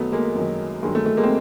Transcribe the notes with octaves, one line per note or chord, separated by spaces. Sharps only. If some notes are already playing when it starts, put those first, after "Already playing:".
Already playing: F#2 D#3 F#3 A3 B3
G#3 A#3
F#2 D#3 F#3
G2 D#3 F#3 G#3
A3
A3
G#3 A#3
C4